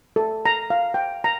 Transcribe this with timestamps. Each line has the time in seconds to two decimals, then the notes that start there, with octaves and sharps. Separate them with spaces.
0.16 A4
0.45 A#5
0.70 F5
0.94 G5
1.24 A#5